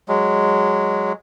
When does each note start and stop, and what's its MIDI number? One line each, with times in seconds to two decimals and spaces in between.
0.08 1.12 54
0.08 1.12 56